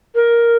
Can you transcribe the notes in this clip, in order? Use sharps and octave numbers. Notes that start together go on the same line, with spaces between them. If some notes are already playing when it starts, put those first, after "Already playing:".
A#4